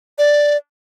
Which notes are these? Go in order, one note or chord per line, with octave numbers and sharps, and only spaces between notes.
D5